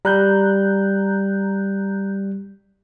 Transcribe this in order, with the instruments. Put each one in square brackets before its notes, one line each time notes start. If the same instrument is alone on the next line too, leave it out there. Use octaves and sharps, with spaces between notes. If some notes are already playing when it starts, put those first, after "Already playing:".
[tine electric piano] G3 [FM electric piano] A#5 F#6 G6